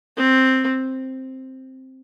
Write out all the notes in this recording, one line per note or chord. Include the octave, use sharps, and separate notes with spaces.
C4